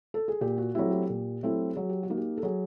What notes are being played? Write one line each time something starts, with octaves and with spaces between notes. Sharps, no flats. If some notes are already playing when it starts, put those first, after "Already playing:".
A4
G#4
A#2 G4
F#4
F#3 A3 C4 E4 G4
G4
A#2
F#3 A3 C4 E4
F#3 G#4
G4
F#4
A#3 D#4
G4
A4
F#3 G#4